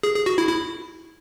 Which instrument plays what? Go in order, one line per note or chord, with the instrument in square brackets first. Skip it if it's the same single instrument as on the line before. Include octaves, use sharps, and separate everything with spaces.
[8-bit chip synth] G#4
G#4
F#4
E4
E4